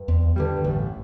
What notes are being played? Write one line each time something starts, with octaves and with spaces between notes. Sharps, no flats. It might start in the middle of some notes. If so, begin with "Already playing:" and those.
Already playing: G2
E2
E2 D3 G3
F2
G2
A1 A2